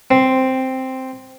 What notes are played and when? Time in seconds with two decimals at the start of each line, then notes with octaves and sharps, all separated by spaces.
0.11 C4